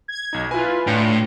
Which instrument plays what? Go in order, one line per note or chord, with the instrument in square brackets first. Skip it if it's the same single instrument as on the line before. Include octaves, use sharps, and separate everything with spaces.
[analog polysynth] G#6
[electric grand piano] B1 D#4
[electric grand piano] E4 G#5 [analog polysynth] F4 B4
[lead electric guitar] A2 [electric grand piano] D4 C#5 G5